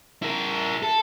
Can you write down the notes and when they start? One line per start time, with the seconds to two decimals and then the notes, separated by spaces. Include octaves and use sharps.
0.22 E4 A#4
0.83 A4